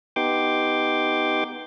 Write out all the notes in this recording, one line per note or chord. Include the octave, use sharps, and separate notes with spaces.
B3 D#4 G4 G5 C6 D6